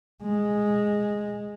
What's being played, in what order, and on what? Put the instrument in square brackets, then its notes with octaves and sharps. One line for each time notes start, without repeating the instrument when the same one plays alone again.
[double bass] G#3